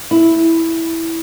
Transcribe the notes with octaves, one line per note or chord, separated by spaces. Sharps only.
E4